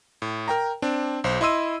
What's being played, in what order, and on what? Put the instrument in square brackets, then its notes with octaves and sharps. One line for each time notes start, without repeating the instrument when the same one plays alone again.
[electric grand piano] A2
A#4 G5 A#5
C4 D4
B1 C5
E4 D#5 C6 E6 D#7